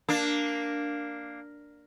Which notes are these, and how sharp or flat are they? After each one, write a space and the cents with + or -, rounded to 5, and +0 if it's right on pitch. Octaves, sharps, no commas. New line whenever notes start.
A#3 +0 D4 +0